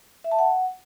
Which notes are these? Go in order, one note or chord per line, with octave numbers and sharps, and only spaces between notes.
E5
A5
F#5